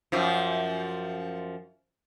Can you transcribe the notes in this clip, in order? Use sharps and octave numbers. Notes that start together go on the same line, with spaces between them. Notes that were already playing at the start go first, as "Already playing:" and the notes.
F#2 F3